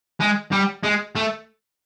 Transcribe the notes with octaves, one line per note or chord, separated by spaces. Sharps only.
G#3
G3
G#3
A3